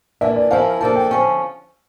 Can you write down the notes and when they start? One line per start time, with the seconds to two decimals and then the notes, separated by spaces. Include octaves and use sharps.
0.21 E3 A#3 D4 E5
0.36 D5
0.51 F3 C#4 E4 A#4 F5
0.81 F3 A#3 D4 A4 A5
0.96 G5
1.11 D3 F3 C#4